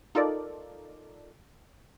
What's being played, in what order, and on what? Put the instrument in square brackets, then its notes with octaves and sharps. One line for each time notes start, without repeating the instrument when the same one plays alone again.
[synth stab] D#4 F4 A4 A#4 D5